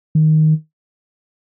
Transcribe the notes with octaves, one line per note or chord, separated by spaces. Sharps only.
D#3